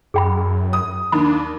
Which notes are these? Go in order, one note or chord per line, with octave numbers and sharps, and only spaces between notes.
F#2 G#4 G5 B5
D#6
D#2 D4 B5